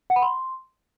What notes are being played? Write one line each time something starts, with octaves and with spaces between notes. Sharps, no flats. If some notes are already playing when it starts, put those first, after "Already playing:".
F#5
B5
C6